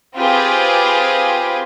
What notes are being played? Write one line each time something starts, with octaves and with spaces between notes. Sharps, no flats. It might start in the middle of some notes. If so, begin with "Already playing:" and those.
C4 F4 G4 G#4 B4